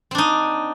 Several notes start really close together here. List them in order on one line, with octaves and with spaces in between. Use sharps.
C4 D4 D#4